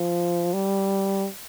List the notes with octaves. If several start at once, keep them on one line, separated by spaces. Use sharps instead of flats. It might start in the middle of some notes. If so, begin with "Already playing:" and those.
Already playing: F3
G3